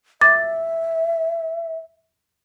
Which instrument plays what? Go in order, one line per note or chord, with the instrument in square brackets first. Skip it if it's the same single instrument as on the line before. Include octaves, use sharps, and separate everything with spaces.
[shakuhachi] E5 [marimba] D6 A6